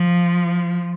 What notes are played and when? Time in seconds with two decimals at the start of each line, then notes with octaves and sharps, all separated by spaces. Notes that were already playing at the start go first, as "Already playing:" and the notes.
Already playing: F3